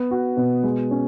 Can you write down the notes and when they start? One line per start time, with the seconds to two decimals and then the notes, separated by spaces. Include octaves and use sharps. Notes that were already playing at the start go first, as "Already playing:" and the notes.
Already playing: B3
0.11 F#4
0.37 B2
0.63 G#3
0.91 C#4